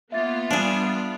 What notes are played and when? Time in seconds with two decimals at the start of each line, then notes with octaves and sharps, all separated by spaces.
0.12 A#3 B3 F4 E5 A6
0.50 G3 D4 G#4